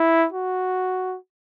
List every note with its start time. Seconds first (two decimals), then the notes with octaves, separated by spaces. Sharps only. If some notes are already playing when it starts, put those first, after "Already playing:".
Already playing: E4
0.32 F#4